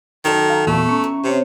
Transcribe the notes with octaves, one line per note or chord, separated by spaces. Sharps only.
F#2 D#3 A4 A5
F5 A#5
E2 A#2 A3 B3 C#6
C#4 A#5 C#6
E3
C3 C4 C5 C#5